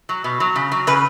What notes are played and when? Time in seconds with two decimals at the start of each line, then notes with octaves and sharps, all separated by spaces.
0.09 F#3
0.24 B2
0.40 F#3
0.56 C#3
0.72 F#3
0.87 C#3 B4